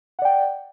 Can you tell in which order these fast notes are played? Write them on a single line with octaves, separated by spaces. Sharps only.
F#5 D5 G5